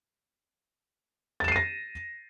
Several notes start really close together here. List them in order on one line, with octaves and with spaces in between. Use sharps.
A6 E7 C7 D#7 A#6